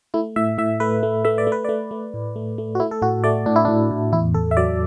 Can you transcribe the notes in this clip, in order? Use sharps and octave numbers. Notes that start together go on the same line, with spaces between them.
A3 E4
A2 E5
A2 E5
A3 B4
A3
A3 E5
D5
A3
B4
A3 D5
A3
A2
A3
A3
F#4
A3 E4
A4
A2 F#4
A3 D5
A2 D4
E4
A2 D4
A2
E2 E4
E2 A4
E5
F#3 D5